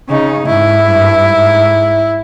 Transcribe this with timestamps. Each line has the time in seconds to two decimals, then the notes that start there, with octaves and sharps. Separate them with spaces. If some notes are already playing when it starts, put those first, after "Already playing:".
0.09 C#3 D#4
0.47 G#2 E4
0.88 G2
1.27 G#2